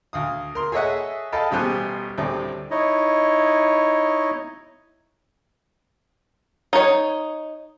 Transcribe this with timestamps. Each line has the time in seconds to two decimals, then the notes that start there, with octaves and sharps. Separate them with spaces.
0.13 D2 F5 D#6
0.55 A#4 C6
0.72 G#4 A4 C#5 D#5 E5 F#5
1.32 A4 D#5 F5 G5 A5 B5
1.51 A1 B2 G3 C5 G#5 F#6
2.18 D2 A2 C3 G3 C4 D5
2.71 D#4 E4 C#5 D#5
6.73 D#4 C#5